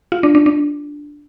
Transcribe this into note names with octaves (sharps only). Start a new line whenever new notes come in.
F4
D4
D4
D4